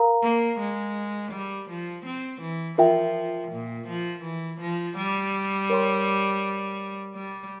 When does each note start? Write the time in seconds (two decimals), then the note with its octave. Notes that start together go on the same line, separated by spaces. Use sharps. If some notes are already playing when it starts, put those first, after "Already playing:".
Already playing: A#4 F5 A#5
0.23 A#3
0.60 G#3
1.32 G3
1.70 F3
2.06 C4
2.42 E3
2.78 F3 F4 A#4 E5 G5
3.52 A#2
3.88 F3
4.24 E3
4.60 F3
4.97 G3
5.70 A#4 C#5 G5 C6
7.15 G3